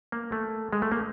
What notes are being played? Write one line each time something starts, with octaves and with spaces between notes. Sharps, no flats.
A#3
A3
G#3
A3
A#3